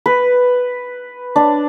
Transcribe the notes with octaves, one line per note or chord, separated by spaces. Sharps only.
B4
D4